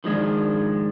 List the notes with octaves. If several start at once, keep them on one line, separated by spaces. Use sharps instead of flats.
D#3 F3 G#3 D4